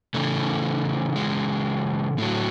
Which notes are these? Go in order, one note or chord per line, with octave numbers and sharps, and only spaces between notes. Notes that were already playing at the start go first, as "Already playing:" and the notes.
C#3 E3 A3
G#3
A2 F#3 A3